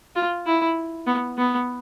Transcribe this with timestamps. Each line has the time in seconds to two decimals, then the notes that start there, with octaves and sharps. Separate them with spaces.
0.16 F4
0.46 E4
1.07 B3
1.38 B3